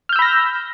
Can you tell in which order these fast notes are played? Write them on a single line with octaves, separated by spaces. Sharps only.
F6 G6 E6 B5 A#6